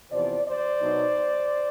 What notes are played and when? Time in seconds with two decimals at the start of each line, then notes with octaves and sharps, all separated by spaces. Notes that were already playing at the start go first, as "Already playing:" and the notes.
0.11 E2 C3 F3 C5 D5
0.46 C5 D5
0.80 B2 F#3 B3 D#4